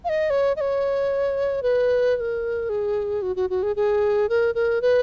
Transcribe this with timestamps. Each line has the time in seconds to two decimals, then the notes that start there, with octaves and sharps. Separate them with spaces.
0.04 F5
0.09 D#5
0.30 C#5
0.57 D#5
0.61 C#5
1.63 B4
2.16 B4
2.20 A#4
2.69 G#4
3.22 F#4
3.36 F#4
3.50 F#4
3.63 G#4
3.76 G#4
4.29 A#4
4.55 A#4
4.82 B4